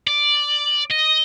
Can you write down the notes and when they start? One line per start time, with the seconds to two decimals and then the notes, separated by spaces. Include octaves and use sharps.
0.08 D5
0.91 D#5